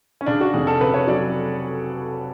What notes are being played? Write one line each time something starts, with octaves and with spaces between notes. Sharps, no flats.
C#4
C#3 D4
F#4
F1 G#4
A4
C#3 B4
C#5
F#3 D5